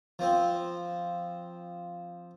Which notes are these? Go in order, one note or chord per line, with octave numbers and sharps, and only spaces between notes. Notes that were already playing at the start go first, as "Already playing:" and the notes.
F3 C4